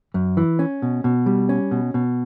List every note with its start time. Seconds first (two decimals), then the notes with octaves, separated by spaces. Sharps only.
0.14 F#2
0.37 E3
0.59 C#4
0.82 B2
1.04 B2
1.26 G3
1.49 C#4
1.71 B2
1.94 B2